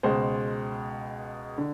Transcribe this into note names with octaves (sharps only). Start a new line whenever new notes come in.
C#2 B2 G#3 C5
D3